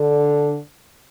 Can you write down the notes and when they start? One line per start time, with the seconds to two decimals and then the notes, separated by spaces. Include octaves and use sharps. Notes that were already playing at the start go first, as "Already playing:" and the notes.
Already playing: D3